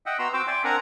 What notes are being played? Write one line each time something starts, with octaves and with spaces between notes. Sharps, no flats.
D#5 E5 F#5 G5
B3 F#4 A#5 C6 E6
C4 F#4 C5 G5 D6 E6
D5 E5 G5 G#5 C6 D6
C4 D4 A#4 F#5 G#5 A#5